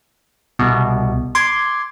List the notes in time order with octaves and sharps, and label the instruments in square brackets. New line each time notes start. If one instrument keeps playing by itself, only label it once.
[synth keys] C2 B2
C6 D6 G#6